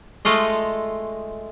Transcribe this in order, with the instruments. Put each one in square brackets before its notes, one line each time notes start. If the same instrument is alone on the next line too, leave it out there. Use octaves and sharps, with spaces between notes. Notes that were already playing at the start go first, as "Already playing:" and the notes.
[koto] G#3 A3 F4 D#5